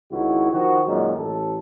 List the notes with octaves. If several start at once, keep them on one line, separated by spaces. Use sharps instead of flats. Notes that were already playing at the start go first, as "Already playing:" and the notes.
C#2 D#3 E4 F#4
D#3 F3 F#4
F#2 A#2 D#3 G#3
A1 A4